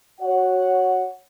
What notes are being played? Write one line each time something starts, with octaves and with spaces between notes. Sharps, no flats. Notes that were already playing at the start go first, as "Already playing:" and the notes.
F#4 C#5 F#5